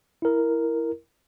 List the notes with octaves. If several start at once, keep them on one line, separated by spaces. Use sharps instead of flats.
E4 A#4